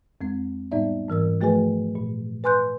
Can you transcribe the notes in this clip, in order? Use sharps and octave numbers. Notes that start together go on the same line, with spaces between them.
F2 G#3 C4
A2 G3 B3 D#4 D5 E5
G#2 E3 A#4 E6
F3 A3 F#4 G#4 B4 G#5
A#2
B4 G#5 C6 F#6 G6